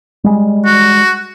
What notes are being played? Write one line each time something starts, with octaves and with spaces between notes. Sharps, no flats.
G3 G#3
F#4